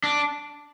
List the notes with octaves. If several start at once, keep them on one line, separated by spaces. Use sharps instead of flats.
D4